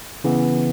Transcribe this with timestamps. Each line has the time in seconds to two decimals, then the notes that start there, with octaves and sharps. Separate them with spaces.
0.24 C#3 E3 B3